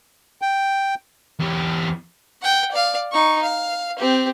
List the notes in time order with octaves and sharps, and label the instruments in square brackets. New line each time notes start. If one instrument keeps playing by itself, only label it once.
[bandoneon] G5
[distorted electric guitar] E2 G4
[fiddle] F#5 G5
D5 F5
D#4 C#6
F5
C4 G4